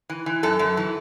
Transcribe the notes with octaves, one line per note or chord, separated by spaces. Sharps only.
E3
E3
F#2 A4
F#2
E3